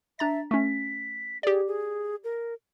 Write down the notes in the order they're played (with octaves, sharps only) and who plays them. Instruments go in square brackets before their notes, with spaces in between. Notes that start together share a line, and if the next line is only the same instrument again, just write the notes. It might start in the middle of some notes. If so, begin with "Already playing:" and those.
[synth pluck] D4 A#5 A6 [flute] E5
[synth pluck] A3 C#4 [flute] B6
[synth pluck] G4 D5 [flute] G#4
[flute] G#4
A#4